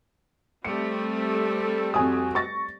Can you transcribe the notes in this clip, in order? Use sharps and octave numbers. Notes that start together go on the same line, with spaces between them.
G3 A3 C4 C#7
A4
F2 F#4 G#5 D#6
C#6 A6 A#6